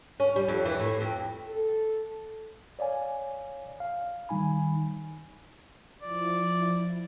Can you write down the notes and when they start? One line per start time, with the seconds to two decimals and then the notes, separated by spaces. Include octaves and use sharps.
0.20 C#4
0.36 G3
0.48 F2
0.66 E3
0.80 A2
1.01 F2
1.48 A4
2.79 C#5 D5 F5 G#5
3.80 F5
4.29 D#3 G3 D#4 G#5 B5
6.02 F3 E4 D5